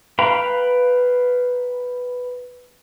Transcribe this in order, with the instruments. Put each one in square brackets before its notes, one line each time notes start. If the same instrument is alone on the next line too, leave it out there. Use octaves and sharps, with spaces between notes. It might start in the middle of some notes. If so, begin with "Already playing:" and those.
[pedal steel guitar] B4 F5 G5 A#5 B5